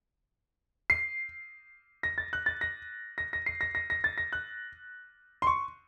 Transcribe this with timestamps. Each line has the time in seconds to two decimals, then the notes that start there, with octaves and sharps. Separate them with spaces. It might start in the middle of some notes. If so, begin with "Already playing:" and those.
0.90 C7
2.03 A#6
2.18 A6
2.33 F#6
2.46 A6
2.61 A#6
3.18 A#6
3.33 A#6
3.46 C7
3.61 A#6
3.75 A#6
3.90 A#6
4.04 A6
4.18 A#6
4.33 F#6
5.42 C6
5.47 C#6